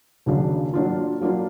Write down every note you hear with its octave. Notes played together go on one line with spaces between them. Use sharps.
D#2 C#3 F#3 A#3 D4
F#3 A#3 D4 F4
F#3 A#3 D4 F4